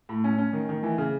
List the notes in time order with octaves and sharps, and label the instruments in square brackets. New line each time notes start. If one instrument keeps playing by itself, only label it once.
[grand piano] A2
C#4
C#4
D#3
D#3
E3
C#3